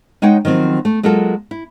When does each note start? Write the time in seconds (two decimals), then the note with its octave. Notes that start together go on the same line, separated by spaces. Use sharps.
0.22 G#3 D#4 C#5 F#5 G5
0.45 D#3 F3 F#3 C4
0.85 A3
1.03 F#3 G#3 A#3 F4 F#4 A4
1.51 E4